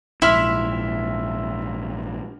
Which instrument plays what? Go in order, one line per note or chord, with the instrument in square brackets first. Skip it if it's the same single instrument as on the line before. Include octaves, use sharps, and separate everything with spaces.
[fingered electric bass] A#1 G#2 [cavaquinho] E4 [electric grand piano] E5 C6 F6